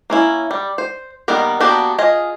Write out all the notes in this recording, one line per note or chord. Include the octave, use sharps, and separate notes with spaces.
A#3 C#4 E4
G3
C5
D#3 G3 A#3 B3 A#4
A#3 B3 D4 F#4 G4
F4 G#4 D#5